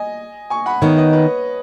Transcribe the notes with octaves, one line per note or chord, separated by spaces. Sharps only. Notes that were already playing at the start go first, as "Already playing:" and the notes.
Already playing: D#5 G#5
G#5 C#6
F#5 B5
D#3 B3 D#4 C#5 F#5
B4 D#5
B4